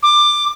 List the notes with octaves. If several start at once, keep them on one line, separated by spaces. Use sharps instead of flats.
D6